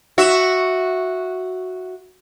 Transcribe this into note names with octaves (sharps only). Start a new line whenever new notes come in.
F#4 E5